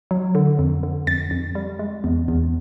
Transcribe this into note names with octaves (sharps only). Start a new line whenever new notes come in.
F#3
D3
F2
D3
F2 A6
F2
G3
G#3
E2
E2